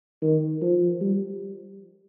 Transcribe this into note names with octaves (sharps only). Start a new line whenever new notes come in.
D#3
F3
G3